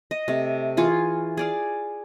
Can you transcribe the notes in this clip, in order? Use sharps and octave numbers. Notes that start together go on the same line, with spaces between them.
D#5
C3 A3
E3 F4 G#4 C#6
G#4 D5 F5